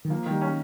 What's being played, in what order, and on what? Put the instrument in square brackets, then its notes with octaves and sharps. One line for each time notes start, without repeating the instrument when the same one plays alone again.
[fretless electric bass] D#3
[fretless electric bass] F3 [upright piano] A#3
[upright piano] D#3
[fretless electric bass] G3
[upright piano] C#4